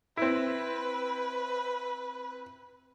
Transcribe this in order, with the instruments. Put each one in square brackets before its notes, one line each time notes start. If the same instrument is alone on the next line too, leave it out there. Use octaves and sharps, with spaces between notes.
[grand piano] C4 E4 [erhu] B4